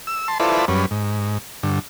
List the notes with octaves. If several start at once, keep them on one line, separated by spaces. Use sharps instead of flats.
E6
A5 C6
E4 F4 A4 B4 C5 D5
F#2 G3 C#4 B4
G#2
G2 D3